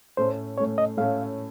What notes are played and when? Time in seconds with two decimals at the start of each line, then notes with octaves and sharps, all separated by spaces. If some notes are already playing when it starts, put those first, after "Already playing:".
0.17 A2 A3 C#4 C5
0.58 A2 A3 C#4 C#5
0.78 D#5
0.97 A2 A3 C#4 F5